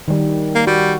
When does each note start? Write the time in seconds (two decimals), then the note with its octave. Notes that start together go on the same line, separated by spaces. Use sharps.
0.08 D#3 G3
0.55 A#3
0.67 G3 F#4